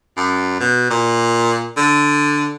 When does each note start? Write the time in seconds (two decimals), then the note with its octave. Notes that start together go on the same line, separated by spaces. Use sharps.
0.18 F#2
0.60 B2
0.90 A#2
1.77 D3